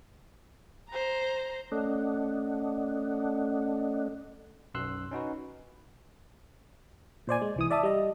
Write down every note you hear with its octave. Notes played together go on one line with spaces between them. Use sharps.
C5 A#5
A3 C#4 A4 D5 D#5 F#5
B1 F#2 C6 E6 F#6
C#4 D#4 F#4 B4
A#2 C5 D5 G#5
G#3
C2 E3 D#6
D5 E5 A5 D#6
G3 D#5